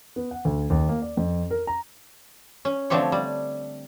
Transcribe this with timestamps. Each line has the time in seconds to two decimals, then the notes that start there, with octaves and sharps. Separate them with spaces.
0.16 B3
0.31 F#5
0.45 D2
0.70 D#2
0.89 A#3
1.02 D5
1.17 F2
1.51 A#4
1.67 A#5
2.65 C#4
2.90 D3 F3 A3 C4 G4 C#5
3.12 G3